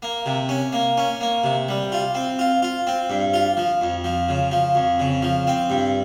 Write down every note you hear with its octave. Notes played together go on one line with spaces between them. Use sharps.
A#3
C3
C#4
A#3
C#4
A#3
C3
G3
F4
C4
F4
F4
C4
G2
F4
F3
F2
F3
C#3
F3
F2
C#3
F3
C4
G2